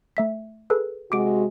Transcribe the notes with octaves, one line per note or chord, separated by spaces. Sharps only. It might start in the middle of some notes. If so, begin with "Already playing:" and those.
A3 E5 B6
G#4 A4 B4
C3 G#3 F#4 D6 D7